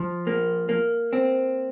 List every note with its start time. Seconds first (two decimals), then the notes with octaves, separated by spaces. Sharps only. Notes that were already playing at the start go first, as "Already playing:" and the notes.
Already playing: F3
0.27 A#3
0.69 A#3
1.13 C4